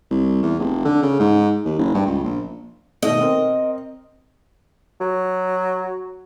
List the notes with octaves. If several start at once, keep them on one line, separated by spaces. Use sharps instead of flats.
C2
E2
F1
D3
C#3
G#2
D#2
F#1
G2
C#2
A#1
B2 D#3 A3 D#5
C4 A#4
F#3